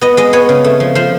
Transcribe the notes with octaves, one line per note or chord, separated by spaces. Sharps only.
B3 D#5
G#3 D#5
B3 C#5
C#3
A3
F3
F3 C5